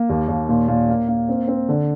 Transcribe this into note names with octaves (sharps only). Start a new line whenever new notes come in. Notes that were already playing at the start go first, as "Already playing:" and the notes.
Already playing: A#3
D#2
D#2
A#2
A#2
A#3
A#3
C4
C4
D3